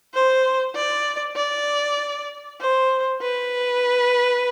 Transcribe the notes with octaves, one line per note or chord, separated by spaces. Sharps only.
C5
D5
D5
C5
B4